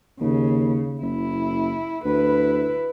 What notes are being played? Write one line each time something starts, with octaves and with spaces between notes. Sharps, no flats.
D#2 C#3
F#1 E4
D2 E4 B4